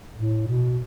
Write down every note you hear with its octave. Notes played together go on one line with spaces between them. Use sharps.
A2
B2